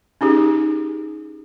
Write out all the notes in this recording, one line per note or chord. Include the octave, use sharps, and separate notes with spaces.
C#4 D#4 G4 G#4